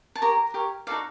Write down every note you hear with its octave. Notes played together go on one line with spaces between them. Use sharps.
A5
G4 A#4 C#5 A#5
G4 A#4 C#5
D#4 F#4 A4 D5 F5